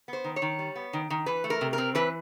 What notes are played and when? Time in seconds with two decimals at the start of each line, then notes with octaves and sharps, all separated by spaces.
0.08 B3 C5
0.24 D#3
0.36 C#5
0.42 D#3
0.59 G3
0.75 B3
0.93 D#3
1.10 D#3
1.26 E3 B4
1.44 A3
1.50 A#4
1.61 C3
1.73 A#4
1.78 C4
1.95 E3 B4